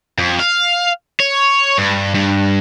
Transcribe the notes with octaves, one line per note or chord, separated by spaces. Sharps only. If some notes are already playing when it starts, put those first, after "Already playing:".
F2
F5
C#5
G2
G2